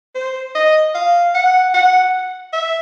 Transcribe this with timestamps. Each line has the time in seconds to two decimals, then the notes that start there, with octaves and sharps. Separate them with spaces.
0.15 C5
0.55 D#5
0.95 F5
1.34 F#5
1.74 F#5
2.53 E5